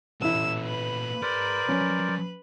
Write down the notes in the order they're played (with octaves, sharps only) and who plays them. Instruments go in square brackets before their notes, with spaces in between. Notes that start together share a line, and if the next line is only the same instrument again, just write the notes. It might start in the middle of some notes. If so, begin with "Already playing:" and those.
[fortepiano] A1 E4 [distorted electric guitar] A#2 B3 [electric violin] E6
[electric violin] B4 B5
[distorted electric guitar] G#4 A#5 [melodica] A#4 C5 D5
[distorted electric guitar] F3 F#3 [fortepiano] C#4